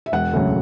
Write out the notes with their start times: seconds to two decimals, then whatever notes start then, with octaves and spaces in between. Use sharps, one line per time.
0.06 E5
0.12 E1 F#5
0.33 D2 C#3 F#3